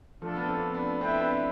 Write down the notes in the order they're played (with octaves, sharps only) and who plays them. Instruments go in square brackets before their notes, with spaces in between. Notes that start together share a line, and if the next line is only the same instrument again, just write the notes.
[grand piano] F3 A3 [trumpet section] D4 F4 A4
[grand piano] B3
A3 C4
B3 D4
[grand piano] A3 C4 [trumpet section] E4 B4 E5 G5
[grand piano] B3 D4